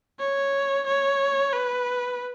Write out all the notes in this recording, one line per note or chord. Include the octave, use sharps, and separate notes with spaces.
C#5
C#5
B4